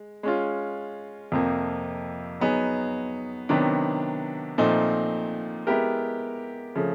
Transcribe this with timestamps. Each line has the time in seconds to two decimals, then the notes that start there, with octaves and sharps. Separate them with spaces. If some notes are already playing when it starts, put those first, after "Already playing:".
Already playing: G#3
0.23 G#3 C#4 F4
1.32 F2 C3 F3 A#3
2.40 F#3 B3 D#4 G#4
3.49 C3 D#3 F#3 B3 D4
4.58 A#2 F3 A3 C4 D#4
5.67 G#3 B3 E4 G4 A#4
6.75 C#3 F3 A3